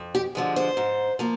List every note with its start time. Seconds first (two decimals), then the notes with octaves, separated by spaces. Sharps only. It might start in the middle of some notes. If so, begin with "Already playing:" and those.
Already playing: F2
0.15 G4
0.35 D3 F3 G#3
0.56 C5
0.77 G#2
1.19 F3 A#3